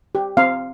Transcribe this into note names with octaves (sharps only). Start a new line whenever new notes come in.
G4
C4 F5